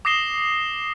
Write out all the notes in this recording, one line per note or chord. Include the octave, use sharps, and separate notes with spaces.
D6 D#6 A#6 C7 E7 G7